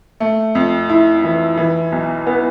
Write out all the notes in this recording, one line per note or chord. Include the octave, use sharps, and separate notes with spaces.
A3
F2
E4
E3
E3
B1
B3